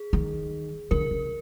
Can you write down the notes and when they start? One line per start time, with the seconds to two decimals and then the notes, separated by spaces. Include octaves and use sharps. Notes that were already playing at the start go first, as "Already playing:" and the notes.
Already playing: G#4
0.13 D#3
0.91 D3 A#4
1.11 C#3